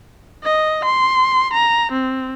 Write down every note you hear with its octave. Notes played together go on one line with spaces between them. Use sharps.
D#5
C6
A#5
C4